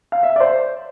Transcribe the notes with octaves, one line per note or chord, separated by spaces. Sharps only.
F5
E5
D5
C5